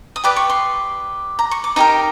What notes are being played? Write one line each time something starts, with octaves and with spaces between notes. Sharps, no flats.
D#6
G4 B4 D5 D6
C#6
C6
A#5
C#6
D6
D#4 G4 A#4 A#5